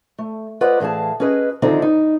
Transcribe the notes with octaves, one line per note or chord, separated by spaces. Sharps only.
A3
F4 B4 C5 D5 D#5 F#5
A2 E3 G#4 F5 A5
C#4 F#4 G#4 B4 D#5
D3 D#3 F3 C4 D#4 E4
D#4